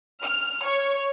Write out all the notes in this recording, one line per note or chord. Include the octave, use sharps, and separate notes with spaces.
F6
C#5